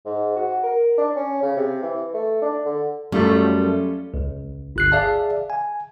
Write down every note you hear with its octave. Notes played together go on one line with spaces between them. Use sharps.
G#2
F#4
A#4
D4
C#4
C#3
C3
E3
A3
D4
D3
F#2 G3 A3 C#4 F4 A4
C#2
G1 F#6 C7
G#4 D5 E5 F5 A5
G#5